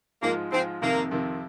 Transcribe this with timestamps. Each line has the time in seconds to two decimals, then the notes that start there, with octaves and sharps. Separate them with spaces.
0.22 G#2 F3 G#3 A#3 F4
0.52 G#2 F3 G#3 C4 F4
0.82 F2 C3 D#3 A#3
1.11 F2 C3 D#3